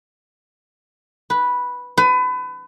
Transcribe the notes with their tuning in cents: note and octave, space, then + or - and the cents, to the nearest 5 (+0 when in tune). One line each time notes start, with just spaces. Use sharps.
B4 -5
B4 +30